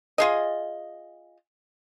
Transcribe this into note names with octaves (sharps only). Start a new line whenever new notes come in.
F4 G#4 D#5